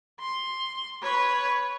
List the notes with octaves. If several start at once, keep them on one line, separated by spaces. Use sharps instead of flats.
C6
B4 C#5